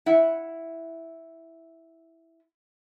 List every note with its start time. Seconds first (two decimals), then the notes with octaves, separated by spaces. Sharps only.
0.06 E4 F#5